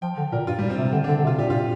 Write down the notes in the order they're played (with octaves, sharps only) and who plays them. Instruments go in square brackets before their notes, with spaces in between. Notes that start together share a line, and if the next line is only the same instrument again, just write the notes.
[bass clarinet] F3 [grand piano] G5
[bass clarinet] D3
[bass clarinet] A#2 [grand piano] A#4
[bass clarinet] G2 [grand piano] F4
[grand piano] G3
[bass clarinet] A#2
[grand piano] C4
[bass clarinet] C3
[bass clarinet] D3 [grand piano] C4
[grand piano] D4
[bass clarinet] D3
D3
C3
[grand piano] F4
[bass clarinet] A#2 [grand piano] G4
[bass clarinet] G2 A#2 [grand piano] F4